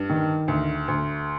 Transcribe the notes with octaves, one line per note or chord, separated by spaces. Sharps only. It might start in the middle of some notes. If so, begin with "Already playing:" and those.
Already playing: G2
D#3
D2
D2